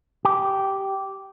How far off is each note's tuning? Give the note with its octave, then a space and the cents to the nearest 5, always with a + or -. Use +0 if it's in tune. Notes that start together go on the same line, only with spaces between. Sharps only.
G4 -10